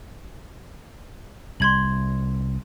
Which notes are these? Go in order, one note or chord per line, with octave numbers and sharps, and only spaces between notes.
C2 C6 G#6 F#7